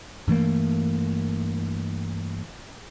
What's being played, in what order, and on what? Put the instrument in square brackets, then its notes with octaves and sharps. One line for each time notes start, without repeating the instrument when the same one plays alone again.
[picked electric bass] G2 E3 A3 A#3